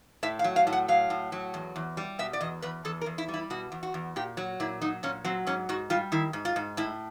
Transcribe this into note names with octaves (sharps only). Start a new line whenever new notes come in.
A2 E5
F5
F#3
F5
A2
F#5
F#3 F5
A2
F#3
E2
E2
G3
B2 E5
D5
E2 D#5
E2 B4
E2 A4
A#4
E2
E4
G3
E4
B2 F#4
E2
F#4
E2
A#2 G4
F#3 F#4
A#2 E4
F#3 D#4
A#2 C#4
F#3 C4
G#2 C#4
G#2 F#4
G3 F4
D#3 E4
G#2
F4
G#2
A2 E4